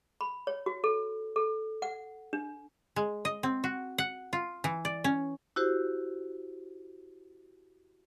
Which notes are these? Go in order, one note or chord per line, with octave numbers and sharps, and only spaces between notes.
B5
C#5
F#4
A4
A4
F#5
D4
G#3
D#5
C4
F#4
F#5
F4
E3
D5
C#4
E4 F#4 G4 C5